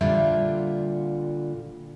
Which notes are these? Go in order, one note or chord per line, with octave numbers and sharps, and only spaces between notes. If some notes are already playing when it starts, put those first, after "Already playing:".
A#2 D3 G3 F4 E5